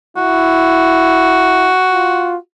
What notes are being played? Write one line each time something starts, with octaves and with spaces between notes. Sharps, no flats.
E4 F#4
F4